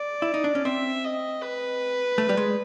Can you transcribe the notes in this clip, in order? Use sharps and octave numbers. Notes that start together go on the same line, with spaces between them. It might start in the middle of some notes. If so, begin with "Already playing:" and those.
Already playing: D5
E4
D#4
D4
C#4
C4 E5
D#5
B4
A3
G3
G#3